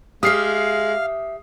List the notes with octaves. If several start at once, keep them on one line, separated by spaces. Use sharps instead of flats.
G#3 G4 E5 F5 D#6 F6 C7